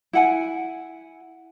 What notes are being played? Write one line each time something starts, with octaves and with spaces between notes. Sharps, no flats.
E4 F#5 G#5